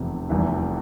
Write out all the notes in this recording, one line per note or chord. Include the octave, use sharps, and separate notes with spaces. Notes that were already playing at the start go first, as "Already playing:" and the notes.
Already playing: F1 E2 C3
F1 E2 E3 G3